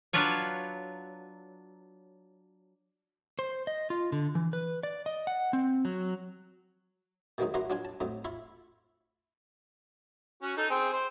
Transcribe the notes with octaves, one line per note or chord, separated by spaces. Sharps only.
F#3 D4 F4 B4 C#5
C5
D#5
F4
D3
E3
B4
D5
D#5
F#5
C4
F#3
B2 D#3 E3 F#3 G#3 D#4
F#2 E3 F#4 B4 A#5 C6
F#3 D4 F4 G#5
A5
A2 F#3 C4 D#4
E4 F4 B5 C#6
C#4 F#4
D#4 A4
C4 G#4
C5